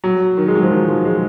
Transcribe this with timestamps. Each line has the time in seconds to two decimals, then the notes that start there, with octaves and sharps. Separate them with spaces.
0.04 F#3
0.37 D#3
0.48 G#3
0.55 F#3
0.63 F3
0.71 D#3
0.88 F3
1.05 G#3